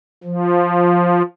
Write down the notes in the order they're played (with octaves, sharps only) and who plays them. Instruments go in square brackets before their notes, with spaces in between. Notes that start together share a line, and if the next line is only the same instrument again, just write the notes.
[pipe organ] F3